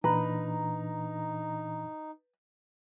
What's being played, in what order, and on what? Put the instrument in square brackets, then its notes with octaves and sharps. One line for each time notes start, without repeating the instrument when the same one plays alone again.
[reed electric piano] A#2 E3 D4 [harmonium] D#4 [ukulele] B4 [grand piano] A#5